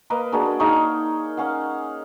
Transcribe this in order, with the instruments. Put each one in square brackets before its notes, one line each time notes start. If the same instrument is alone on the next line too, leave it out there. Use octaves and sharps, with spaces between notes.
[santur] A#3 B4 D#5 F5
A#3 D4 F#4 G#4
D#4 G#4 C#5 F5
C#4 F5 F#5